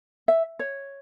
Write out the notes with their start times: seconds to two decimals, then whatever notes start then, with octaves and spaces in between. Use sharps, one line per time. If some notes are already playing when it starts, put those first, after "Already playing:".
0.28 E5
0.59 C#5